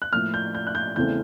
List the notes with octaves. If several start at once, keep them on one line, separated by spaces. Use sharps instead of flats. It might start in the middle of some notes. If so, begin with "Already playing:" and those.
F#6
A2 F3 A#3 F6
G6
G6
F#6
G6
E2 C#3 E3 A3 C4 G6